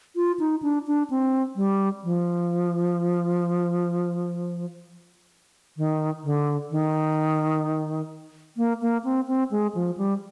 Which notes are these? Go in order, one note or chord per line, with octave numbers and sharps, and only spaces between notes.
F4
D#4
D4
D4
C4
G3
F3
D#3
D3
D#3
A#3
A#3
C4
C4
G#3
F3
G3